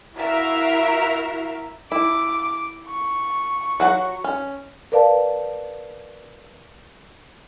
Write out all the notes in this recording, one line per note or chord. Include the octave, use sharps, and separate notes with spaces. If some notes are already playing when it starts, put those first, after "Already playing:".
E4 F#4 A#4 E5 F5
E4 D6
C#6
F#3 F#4 F#5
C#4
A#4 B4 D5 F5 A5